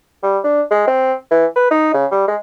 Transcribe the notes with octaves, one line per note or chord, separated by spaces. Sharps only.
G3
D4
G#3
C4
E3
B4
D#4
C#3
G3
G#3